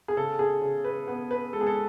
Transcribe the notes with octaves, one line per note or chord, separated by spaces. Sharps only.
G#4
C#3 A4
G#4
C#3
B4
B3 B4
B4
G#3 A4
G#4
A4